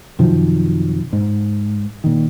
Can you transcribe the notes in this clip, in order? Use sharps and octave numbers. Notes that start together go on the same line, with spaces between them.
F#2 C3 D#3 F3
G#2
A#2 D#3